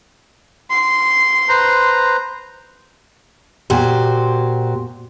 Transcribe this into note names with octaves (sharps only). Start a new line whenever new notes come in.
C6
B4 C5 A#5
A#2 F#4 G4 C5